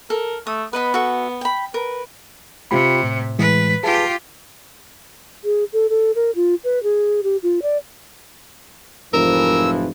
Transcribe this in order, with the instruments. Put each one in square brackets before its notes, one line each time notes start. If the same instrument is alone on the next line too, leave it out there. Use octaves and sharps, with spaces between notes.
[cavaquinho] A4 [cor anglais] A#4
[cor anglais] A3 [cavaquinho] D#6
[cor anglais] B3 [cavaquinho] B4 D#5 B5
[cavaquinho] F#4 A4 E5
G5 B5
[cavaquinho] A#4 [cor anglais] B4
[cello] C3 [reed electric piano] F4 G4 B5
[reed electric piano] A2
[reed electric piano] A2 E3 G#3 [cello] B4
[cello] F4 G4 [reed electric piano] G#4 B4 A5
[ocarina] G#4
A4
A4
A#4
F4
B4
G#4
G4
F4
D5
[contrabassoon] F1 [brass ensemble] G#2 E3 F3 [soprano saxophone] A#4 [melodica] E6